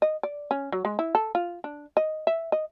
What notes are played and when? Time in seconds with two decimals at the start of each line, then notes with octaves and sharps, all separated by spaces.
0.02 D#5
0.23 D5
0.51 C#4
0.72 F#3
0.85 G#3
0.99 E4
1.15 A4
1.35 F4
1.64 D4
1.97 D#5
2.27 E5
2.52 D#5